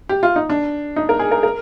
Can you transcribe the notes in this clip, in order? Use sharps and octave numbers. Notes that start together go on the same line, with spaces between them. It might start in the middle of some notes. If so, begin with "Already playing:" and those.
G4
F4
D#4
D4
D#4
A#4
G#4
A#4
A#4